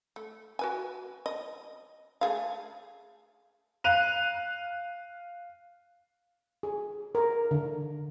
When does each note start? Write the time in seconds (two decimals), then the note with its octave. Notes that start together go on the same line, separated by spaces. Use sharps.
0.16 A3
0.59 F#4 B4 G#5
1.26 D#5
2.21 A3 G#4 F5
3.84 F5 F#6 D#7 F7
6.63 G#4
7.15 A#4
7.51 D3